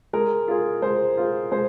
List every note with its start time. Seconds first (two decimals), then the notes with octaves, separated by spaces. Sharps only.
0.13 G#3 A#4
0.48 F4 G#4
0.82 G#3 C5
1.17 F4 G#4
1.51 G#3 C5